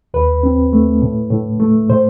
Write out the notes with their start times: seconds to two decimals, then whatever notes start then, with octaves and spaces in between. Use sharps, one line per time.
0.14 D#2 B4
0.43 C4
0.73 A3
1.02 A2
1.31 A2
1.60 A3
1.89 A2 C5